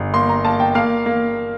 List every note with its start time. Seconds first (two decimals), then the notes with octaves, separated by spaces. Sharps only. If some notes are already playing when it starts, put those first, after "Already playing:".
Already playing: G1
0.14 A#3 C6
0.29 A#5
0.45 A#3 A5
0.60 G5
0.75 A#3 F5
1.06 A#3